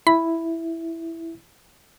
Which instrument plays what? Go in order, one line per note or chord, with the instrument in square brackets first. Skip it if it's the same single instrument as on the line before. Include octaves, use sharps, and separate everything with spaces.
[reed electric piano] E4 [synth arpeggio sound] B5